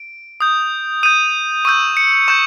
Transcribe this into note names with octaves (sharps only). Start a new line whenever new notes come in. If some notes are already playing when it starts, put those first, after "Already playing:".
Already playing: D7
D#6 G6
D#6 G6 D#7
C#6 E6 G6 D#7
C#7
C#6 E6 G6 E7